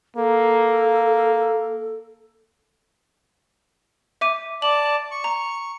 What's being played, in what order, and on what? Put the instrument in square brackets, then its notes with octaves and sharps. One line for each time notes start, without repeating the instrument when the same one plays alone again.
[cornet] A#3 [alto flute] A4
[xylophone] E5 D6 D#7
[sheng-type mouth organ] D5 A5 [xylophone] F#7
[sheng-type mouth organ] C#6
[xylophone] A#5